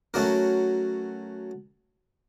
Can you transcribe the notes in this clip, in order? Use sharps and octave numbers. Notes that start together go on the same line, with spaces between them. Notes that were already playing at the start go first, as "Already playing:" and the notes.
F#3 A3 C#4 F#4 A#4